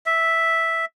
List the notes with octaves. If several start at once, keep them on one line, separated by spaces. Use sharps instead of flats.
E5